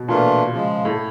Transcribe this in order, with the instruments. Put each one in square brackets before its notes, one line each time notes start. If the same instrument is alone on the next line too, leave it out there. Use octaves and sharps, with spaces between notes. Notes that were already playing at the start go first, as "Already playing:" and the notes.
Already playing: [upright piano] B2
[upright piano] A#2 [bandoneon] E3 A3 D4 F4
[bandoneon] C#3 F3 G#3
[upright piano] A2